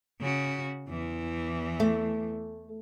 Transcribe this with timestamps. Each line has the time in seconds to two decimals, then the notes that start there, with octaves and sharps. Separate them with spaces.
0.20 C#3 F#4
0.89 E2 E3
1.80 A3